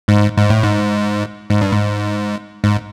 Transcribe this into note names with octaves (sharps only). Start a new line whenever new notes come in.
G#2
G#2
A2
G#2
G#2
G2
G#2
G#2